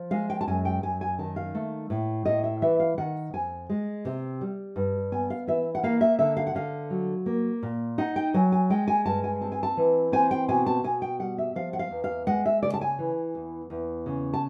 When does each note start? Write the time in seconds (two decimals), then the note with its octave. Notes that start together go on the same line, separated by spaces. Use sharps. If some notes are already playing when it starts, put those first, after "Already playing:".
Already playing: F3
0.11 G#3 F5
0.30 G5
0.41 A5
0.47 F#2 G#5
0.65 G5
0.83 F#2 G#5
1.01 G#5
1.19 D#3 A5
1.36 F5
1.55 A3
1.90 A2
2.25 A2 D#5
2.44 E5
2.62 E3 E5
2.80 F5
2.98 D#3 F#5
3.33 F2 G#5
3.69 G#3
4.05 C3
4.41 G3
4.76 G2
5.12 B3 G#5
5.30 F5
5.47 E3 E5
5.75 F#5
5.83 A#3 F5
6.01 E5
6.19 D3 E5
6.37 F5
6.47 F#5
6.55 D3 F5
6.90 F#3
7.26 A#3
7.63 A#2
7.98 D#4 F#5
8.16 G5
8.34 F#3 G#5
8.52 G#5
8.70 G#3 G5
8.88 G#5
9.05 G2 A5
9.24 G#5
9.41 C4 A5
9.52 G#5
9.63 A5
9.77 E3
10.12 C4 G#5
10.31 G5
10.48 B2 G#5
10.66 A5
10.84 B2 G#5
11.02 G5
11.20 G3 F#5
11.38 E5
11.56 F3 F5
11.73 F#5
11.79 F5
11.91 E2
12.04 F5
12.27 G#3 F#5
12.46 E5
12.63 C#3 D5
12.74 A5
12.81 G#5
12.99 E3
13.35 E2
13.70 E2
14.06 C#3
14.33 A5